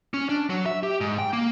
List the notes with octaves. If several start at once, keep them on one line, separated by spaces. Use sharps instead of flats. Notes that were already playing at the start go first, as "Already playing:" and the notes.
C#4
D4
F#3
E5
G4
G#2
G5
A#3